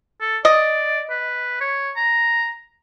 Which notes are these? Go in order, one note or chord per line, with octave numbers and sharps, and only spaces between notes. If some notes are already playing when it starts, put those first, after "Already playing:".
A4
D5 D#5
B4
C#5
A#5